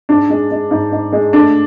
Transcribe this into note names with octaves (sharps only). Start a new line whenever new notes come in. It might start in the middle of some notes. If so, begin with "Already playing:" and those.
G#2 D4
G#3
G#3
G#2
G#2
G#3
A3 D4